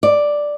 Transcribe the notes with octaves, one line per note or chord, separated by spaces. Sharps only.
D5